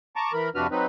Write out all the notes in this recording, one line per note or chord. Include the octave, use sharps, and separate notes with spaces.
A5 A#5 C#6 D6
E3 A#4 B5
F2 C3 D4 F#4 B4 F6
F#3 C4 D#4 B4